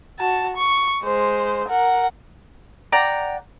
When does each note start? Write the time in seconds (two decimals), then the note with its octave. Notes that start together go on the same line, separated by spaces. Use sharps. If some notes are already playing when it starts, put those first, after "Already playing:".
0.19 F#4 A5
0.56 C#6
1.04 G#3 C5
1.69 A#4 F#5
2.92 D5 F#5 G5 A#5